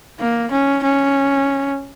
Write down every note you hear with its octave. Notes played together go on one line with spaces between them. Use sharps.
A#3
C#4
C#4